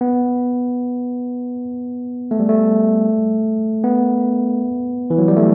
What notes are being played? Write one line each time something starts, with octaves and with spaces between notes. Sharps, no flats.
B3
A3
G3
A3
B3
E3
F#3
G3
A3